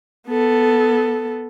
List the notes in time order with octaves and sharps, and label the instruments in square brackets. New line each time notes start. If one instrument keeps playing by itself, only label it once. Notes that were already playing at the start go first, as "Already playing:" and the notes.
[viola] B3 A4